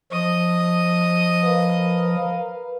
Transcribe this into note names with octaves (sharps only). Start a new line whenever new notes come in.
F3 D#5 D#6
A#4 B4 F5